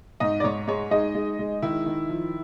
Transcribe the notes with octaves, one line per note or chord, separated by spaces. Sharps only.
G#2 D#4 D#5
D5
G#2 C#5
G#3 C#5
G#3 D#4 D#5
G#3
G#3
D#3 E4 E5
D#3
F3